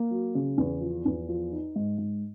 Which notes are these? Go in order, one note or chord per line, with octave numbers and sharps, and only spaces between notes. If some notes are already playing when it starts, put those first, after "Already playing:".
Already playing: A#3
F#3
C#3
E2
F3
E2
F3
D#4
G#2
G#2